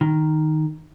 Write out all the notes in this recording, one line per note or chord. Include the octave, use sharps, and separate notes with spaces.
D#3